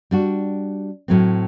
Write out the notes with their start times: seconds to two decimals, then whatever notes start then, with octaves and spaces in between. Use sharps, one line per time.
0.11 G3 D4 F#4
1.08 A2 F#3 C4